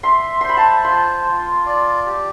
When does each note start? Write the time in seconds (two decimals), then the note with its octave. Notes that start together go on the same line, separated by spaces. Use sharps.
0.03 E5 C6
0.41 C5 C6
0.49 B5
0.57 A5
0.84 F4 C6
1.26 F4
1.66 D5
2.06 G4